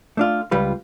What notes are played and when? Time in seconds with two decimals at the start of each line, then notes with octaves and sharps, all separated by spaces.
0.17 A3 D4 F4
0.51 C#2 G3 F4 B4